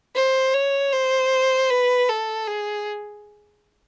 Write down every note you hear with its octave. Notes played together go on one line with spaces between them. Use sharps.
C5
C#5
C5
B4
A4
G#4